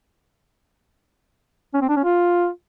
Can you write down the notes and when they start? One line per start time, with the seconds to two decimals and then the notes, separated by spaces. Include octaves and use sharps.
1.74 C#4
1.82 C4
1.89 D4
1.96 C#4
2.04 F4